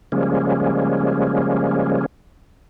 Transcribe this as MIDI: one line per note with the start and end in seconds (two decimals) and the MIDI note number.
0.12 2.06 49
0.12 2.06 53
0.12 2.06 55
0.12 2.06 56
0.12 2.06 58
0.12 2.06 61